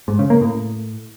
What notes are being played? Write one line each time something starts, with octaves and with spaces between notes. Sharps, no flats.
G#2
C#3
A#3
A2